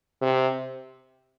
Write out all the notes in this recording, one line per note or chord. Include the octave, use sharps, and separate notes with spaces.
C3